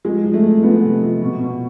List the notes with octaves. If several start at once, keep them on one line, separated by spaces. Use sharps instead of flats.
F3 G#3
F3
A3
F2
F3 B3
C3
F3
B2
B2